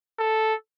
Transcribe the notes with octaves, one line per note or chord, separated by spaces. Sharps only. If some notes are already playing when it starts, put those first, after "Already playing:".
A4